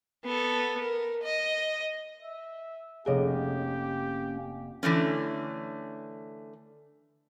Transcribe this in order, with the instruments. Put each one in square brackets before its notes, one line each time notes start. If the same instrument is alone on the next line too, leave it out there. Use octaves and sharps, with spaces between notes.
[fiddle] B3 A4
A#4
D#5
[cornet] E5
[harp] F1 D#5 D7 [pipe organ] A#3 C#4 [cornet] G4 [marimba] G#4 C#5
[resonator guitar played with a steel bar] D3 E3 A3 C#4